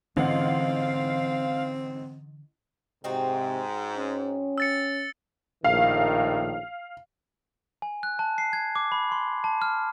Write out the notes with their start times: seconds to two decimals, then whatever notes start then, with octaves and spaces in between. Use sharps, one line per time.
0.17 A1 G#2 D3 E3 C4 C#4 F5 F#5
3.04 G#2 C3 C4 D#4 F#4
3.97 C#4
4.58 E6 A6 C#7
5.64 A#1 A2 D#3 F5
7.82 G#5
8.03 F#6
8.19 A5
8.38 C7
8.53 G#6
8.76 D6
8.92 B5
9.12 C6
9.44 A5
9.62 F6